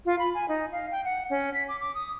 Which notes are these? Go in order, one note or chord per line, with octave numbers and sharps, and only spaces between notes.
F4
B5
G#5
D#4
F5
G5
F#5
C#4
B6
D6
D6
D#6